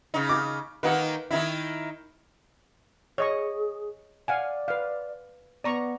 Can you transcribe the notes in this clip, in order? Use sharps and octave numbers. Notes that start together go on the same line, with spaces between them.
C#3 D#4
D6
D#3 A#3 D#4 B4 F#5
D#3 D#4 E4 E5
G#4 C#5 D#5 C#6
D5 F5 F#5 G#5
B4 F5
B3 D5 A#5 C#6